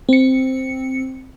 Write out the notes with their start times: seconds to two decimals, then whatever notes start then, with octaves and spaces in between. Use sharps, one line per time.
0.09 C4 C#7